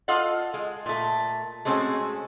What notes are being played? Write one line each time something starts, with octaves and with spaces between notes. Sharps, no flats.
F4 A4 D#5 F5 F#5
G#3
A#2 A3
G#3 A3 C4 C#4 F#4 G#4